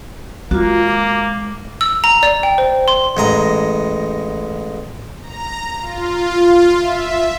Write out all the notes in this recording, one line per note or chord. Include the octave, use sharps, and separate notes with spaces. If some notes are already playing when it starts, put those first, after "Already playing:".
G#3 A#3 F4 F#4
D6
E6
A#5
D5
G5
C5
C6
A1 G#3 A#5
A#5
F4
E5